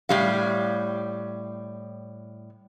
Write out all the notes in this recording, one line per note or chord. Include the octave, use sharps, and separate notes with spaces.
A2 G3 F5